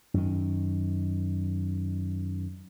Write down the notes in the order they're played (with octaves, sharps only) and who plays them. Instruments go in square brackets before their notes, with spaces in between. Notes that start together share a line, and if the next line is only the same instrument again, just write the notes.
[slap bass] F#2 D#3